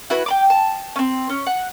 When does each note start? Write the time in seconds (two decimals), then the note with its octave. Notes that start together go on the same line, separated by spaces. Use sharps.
0.10 E4 F#4 B4 G#5
0.26 G5 B5 D6
0.50 A5
0.96 C4 C#4
1.30 C#4
1.47 F#5